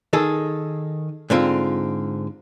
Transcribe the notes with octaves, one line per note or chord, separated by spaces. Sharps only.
D#3 G#4 A4
G#2 D3 C4 F4